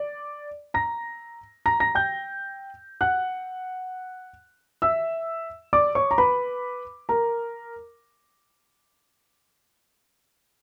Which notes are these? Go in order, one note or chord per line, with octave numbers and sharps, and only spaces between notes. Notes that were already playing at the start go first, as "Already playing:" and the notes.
Already playing: D5
A#5 A#6
A#5 A#6
A#5 A#6
G5 G6
F#5 F#6
E5 E6
D5 D6
C#5 C#6
A#5
B4 B5
A#4 A#5